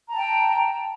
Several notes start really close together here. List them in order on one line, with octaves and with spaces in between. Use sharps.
A#5 A5 G5